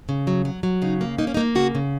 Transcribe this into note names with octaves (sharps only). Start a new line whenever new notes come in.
C#3
F#3
F#3
F#3
C#3 D#4
A#3
A#3 D#4
C#4
D#4
A#3
C#3 F#4
C#3